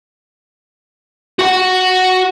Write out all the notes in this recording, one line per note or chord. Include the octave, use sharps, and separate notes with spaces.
F#4 F#5